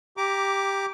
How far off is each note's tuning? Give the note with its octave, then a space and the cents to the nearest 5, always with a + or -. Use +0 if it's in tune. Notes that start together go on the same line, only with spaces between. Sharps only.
G4 +5 A#5 +5 D6 -10